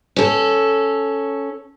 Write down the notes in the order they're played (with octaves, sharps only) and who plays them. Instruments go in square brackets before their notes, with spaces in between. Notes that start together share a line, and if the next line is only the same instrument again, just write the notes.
[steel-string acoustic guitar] C#4 A4